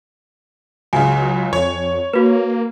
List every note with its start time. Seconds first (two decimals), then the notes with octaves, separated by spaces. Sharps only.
0.93 C#2 C#3 F#3 G#5
1.53 F2 C#5
2.13 A#3 F#4 B4